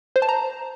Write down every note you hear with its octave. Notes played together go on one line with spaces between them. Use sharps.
C5
A5
A#5